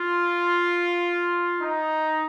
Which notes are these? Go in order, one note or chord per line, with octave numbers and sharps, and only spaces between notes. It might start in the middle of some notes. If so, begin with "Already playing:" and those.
Already playing: F4
D#4